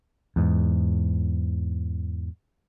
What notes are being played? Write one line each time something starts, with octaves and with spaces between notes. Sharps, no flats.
E2 G#2